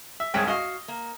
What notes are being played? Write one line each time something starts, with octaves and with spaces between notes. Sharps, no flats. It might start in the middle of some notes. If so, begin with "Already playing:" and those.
E5
C2 G#2 G#4 C#5 G5
F#4 D#5 F5
A#3